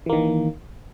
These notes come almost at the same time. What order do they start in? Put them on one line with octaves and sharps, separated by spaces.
E3 A#3 D#3